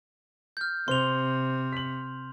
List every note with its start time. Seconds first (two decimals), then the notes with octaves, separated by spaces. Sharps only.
0.57 F6 G6
0.88 C3 C5 C6 F7 G7
1.73 B6 F#7